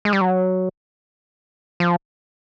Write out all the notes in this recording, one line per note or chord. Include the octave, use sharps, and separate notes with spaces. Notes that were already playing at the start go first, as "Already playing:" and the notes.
G#3
G3
F#3
F3